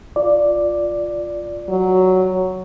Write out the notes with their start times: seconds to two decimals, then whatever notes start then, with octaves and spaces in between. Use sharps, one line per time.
0.16 F4 D5
1.69 F#3